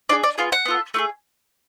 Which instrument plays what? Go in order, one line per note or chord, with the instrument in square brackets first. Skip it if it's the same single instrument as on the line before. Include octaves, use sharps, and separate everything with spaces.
[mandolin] D4 F4 G#4 D5
D5
B3 F4 G#4 F5
F#5
B3 F4 A4
A3 F4 G#4